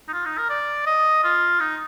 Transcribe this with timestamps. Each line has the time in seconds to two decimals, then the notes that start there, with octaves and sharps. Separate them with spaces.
0.09 D#4
0.13 F4
0.26 D#4
0.38 A#4
0.50 D5
0.87 D#5
1.24 F4
1.60 D#4